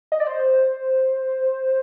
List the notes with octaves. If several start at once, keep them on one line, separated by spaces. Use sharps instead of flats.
D#5
D5
C5